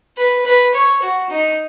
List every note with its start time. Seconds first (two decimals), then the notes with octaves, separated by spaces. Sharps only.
0.17 B4
0.45 B4
0.74 C#5
1.02 F#4
1.30 D#4